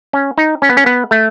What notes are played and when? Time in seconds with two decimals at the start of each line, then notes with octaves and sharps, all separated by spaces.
0.13 C#4
0.38 D#4
0.62 C#4
0.69 B3
0.77 C#4
0.86 B3
1.11 A3